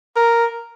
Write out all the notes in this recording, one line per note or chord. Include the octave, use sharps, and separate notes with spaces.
A#4